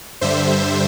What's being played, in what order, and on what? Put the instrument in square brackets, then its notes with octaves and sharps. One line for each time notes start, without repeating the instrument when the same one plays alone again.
[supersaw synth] G2 D3 G3 C5 E5